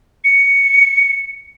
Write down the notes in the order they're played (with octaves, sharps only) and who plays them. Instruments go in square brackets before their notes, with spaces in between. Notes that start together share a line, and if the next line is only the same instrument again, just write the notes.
[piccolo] C#7